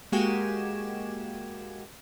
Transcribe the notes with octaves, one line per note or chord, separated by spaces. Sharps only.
G#3 A#3 F#4 G4 G#5 E7